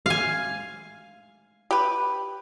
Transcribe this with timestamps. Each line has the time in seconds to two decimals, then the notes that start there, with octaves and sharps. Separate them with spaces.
0.06 F5 G#5
1.71 G4 B4